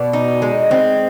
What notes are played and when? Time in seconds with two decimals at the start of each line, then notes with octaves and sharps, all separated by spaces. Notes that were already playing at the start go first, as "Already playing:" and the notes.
Already playing: B2 D5
0.13 D#4
0.42 G#3
0.71 C4